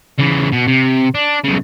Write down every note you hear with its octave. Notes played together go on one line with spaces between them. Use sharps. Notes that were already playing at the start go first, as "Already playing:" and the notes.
C#3 E3
B2
C3
D4
B1 C#3